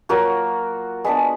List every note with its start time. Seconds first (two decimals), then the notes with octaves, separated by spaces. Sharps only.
0.09 F#3 A#3 F4 F#4 A#4
1.04 G#3 B3 D4 G#4 B4